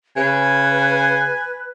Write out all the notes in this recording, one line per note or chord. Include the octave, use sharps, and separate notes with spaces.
C#3 B4 G#5